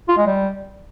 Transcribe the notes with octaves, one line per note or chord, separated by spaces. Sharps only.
F4
G#3
G3